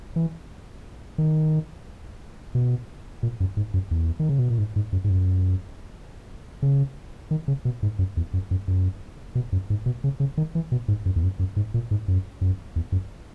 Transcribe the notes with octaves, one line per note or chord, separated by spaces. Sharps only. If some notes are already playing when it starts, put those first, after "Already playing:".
E3
D#3
B2
A#2
F#2
G#2
F#2
E2
D#3
C#3
B2
A#2
G#2
G#2
F#2
G#2
F#2
C#3
D#3
C#3
B2
G#2
F#2
E2
F#2
F#2
F#2
B2
F#2
G#2
B2
C#3
C#3
D#3
E3
B2
G#2
F#2
E2
F#2
F#2
G#2
A#2
G#2
F#2
F#2
E2
F#2